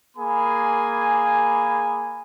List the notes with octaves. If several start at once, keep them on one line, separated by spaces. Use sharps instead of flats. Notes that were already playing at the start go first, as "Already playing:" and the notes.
A#3 G#4 G#5 B5